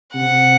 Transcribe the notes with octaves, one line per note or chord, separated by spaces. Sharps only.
C3 F#5